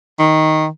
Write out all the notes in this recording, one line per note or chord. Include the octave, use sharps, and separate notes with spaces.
D#3